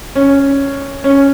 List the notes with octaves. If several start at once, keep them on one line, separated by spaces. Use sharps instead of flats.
C#4
C#4